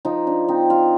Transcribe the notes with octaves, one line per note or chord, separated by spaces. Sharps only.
F3 D#4
D4
C4 D#4
F4